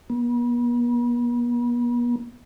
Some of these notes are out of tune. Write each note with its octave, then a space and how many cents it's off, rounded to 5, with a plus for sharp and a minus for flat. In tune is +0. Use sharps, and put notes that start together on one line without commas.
B3 -45